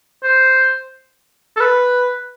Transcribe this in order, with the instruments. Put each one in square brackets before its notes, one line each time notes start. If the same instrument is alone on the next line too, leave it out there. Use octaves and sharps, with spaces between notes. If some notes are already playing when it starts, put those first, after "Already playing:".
[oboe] C5
A4
B4